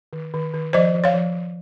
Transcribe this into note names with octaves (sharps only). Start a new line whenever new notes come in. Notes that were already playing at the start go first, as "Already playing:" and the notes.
D#3
D#3
D#3
F3 C5 D#5
F3
C#5 F5
F3
F3